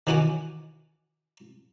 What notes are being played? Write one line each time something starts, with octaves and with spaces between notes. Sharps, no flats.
D#3 E3 F#4 F#5 G#5 D6